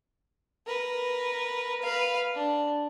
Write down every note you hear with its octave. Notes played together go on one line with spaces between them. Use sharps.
A#4 B4
B4 F5
D4